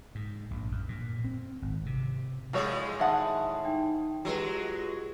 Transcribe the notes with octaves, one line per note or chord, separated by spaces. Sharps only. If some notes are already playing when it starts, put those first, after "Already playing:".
G#2
A#1
F#2
A#2
C4
G#1
C3
A2 F3 G#3 F#4 G#4 C#5 C7
D#3 E5 F#5 A5 D#6
D#4 G5
F#3 G#3 F4 G4 B4